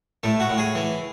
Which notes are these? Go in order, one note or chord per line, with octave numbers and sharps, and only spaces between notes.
A2 A3
F#4
A2
G#4
E3